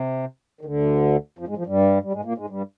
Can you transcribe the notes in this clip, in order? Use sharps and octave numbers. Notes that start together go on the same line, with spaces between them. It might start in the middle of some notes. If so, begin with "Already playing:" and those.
Already playing: C3
D#3
D2 D3
F2 F3
G#2 G#3
F2 F3
G2 G3
G3
G#2 G#3
A#2 A#3
G#2 G#3
G2 G3